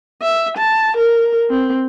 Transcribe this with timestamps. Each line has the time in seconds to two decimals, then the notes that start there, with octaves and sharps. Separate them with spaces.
0.22 E5
0.57 A5
0.97 A#4
1.50 C4